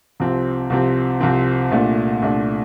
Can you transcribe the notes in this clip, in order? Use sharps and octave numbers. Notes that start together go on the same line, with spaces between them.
C2 C3 F3 C4
C2 C3 F3 C4
C2 C3 F3 C4
C2 A#2 A3 D4
C2 A#2 A3 D4